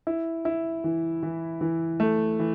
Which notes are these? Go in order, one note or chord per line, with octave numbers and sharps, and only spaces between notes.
E4
E4
E3
E3
E3
A3
E3